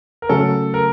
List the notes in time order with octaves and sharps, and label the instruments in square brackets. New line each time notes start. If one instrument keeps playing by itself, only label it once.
[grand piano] A#4
[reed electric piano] C#3 F#3 A3 C#4 [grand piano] A4
[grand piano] A#4